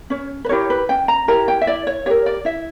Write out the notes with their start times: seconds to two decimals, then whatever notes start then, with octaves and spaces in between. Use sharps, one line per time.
0.10 C#4 C#5
0.44 B4
0.49 E4 G4 A#4 C#5
0.70 B4
0.89 C#4 G5
1.08 A#5
1.28 E4 G4 A#4 A#5
1.48 G5
1.61 E5
1.67 E4 D5
1.87 C#5
2.06 G4 A#4 C#5
2.26 D5
2.45 E4 E5